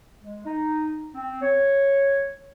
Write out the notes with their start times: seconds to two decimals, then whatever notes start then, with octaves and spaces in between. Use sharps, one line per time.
0.22 G#3
0.46 D#4
1.13 C4
1.41 C#5